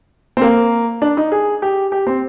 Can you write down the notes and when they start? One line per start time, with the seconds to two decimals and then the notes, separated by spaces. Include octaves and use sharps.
0.37 C4
0.42 A#3
1.02 D4
1.17 D#4
1.32 G#4
1.62 G4
1.92 G4
2.07 C4